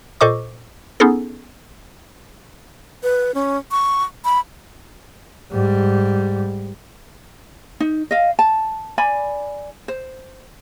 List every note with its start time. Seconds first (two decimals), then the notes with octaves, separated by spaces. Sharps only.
0.21 A#2 A4 C5 D#5 C#6 D6
1.00 B3 C#4 D#4 G#4 A4
3.03 B4
3.35 C#4
3.71 C#6
4.25 B5
5.52 G#2 G3
7.80 D#4
8.11 D#5 F5
8.39 A5
8.98 D5 G#5 B5
9.88 C5